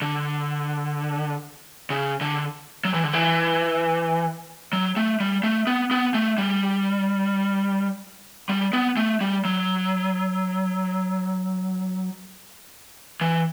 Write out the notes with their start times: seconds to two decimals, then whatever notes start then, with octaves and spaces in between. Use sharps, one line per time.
0.02 D3
1.90 C#3
2.21 D3
2.85 F#3
2.94 E3
3.04 D3
3.13 E3
4.73 F#3
4.97 A3
5.20 G3
5.43 A3
5.67 B3
5.91 B3
6.14 A3
6.38 G3
8.49 G3
8.73 B3
8.97 A3
9.21 G3
9.45 F#3
13.21 E3